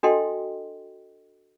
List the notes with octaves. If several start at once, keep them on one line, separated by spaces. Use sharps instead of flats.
D4 F#4 A4 D#5 G5 C6